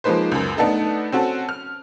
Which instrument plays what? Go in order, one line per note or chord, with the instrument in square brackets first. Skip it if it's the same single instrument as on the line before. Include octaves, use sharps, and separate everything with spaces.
[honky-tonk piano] F3 G#3 A#3 D#4 B4 C5
C#2 F#2
A3 B3 D4 D#4 A4
C4 C#4 F#4 A4
F6